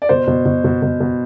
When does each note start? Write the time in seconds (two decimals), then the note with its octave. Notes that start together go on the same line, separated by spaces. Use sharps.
0.02 D5
0.09 B2 C5
0.27 B2
0.46 B2
0.64 B2
0.82 B2
1.00 B2